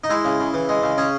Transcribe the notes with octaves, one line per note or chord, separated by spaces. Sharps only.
D#4
G#3 E4
C#3
C#3
E3
G#3
C#3
C#4 G#4